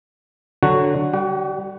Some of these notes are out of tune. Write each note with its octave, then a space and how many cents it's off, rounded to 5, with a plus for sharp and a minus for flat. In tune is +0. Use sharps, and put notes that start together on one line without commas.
D3 +0 F#3 +0 F#4 +0
G3 +0 F#4 +45 F#5 +0